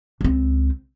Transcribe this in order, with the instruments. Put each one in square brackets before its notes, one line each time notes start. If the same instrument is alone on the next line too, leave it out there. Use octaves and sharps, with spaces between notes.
[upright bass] C#2 C4